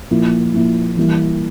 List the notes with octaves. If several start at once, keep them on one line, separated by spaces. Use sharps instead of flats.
A#2 F3 A#3 E4
A#2 F3 A#3 E4
E3 G3 A#3 E4